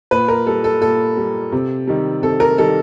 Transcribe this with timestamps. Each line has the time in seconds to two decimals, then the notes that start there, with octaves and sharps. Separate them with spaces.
0.11 A#2 B4
0.28 A#4
0.47 G3 A4
0.64 A4
0.81 A#2 A4
1.17 G3
1.52 C3
1.87 D#3 G3
2.22 C3 A4
2.40 A#4
2.58 D#3 G3 A4